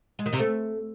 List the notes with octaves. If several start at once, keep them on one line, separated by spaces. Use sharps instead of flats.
G#3
D#3
C3
A3